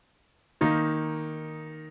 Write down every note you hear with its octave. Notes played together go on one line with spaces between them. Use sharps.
D#3 A#3 D#4